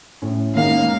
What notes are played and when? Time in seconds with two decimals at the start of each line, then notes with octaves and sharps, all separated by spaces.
0.22 A2 C#4
0.55 D#3 G#3 A#3 C#4 F5